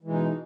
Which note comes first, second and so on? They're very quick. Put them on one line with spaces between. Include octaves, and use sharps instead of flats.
E3 G#3 B2 D#4